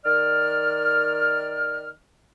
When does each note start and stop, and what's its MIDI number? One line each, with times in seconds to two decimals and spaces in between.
0.06 1.90 51
0.06 1.90 74
0.06 1.90 89